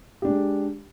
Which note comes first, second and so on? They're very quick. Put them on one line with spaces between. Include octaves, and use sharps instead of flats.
G4 D4 G#3